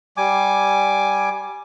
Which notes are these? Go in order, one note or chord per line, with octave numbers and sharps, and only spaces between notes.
G3 G#5 D6